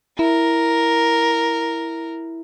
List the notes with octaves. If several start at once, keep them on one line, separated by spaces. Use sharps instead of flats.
E4 A#4